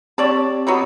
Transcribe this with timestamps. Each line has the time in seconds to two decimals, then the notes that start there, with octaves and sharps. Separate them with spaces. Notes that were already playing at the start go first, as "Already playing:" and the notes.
0.18 C4 G4 C#5 D5 A5 D6
0.67 F#3 B3 D#4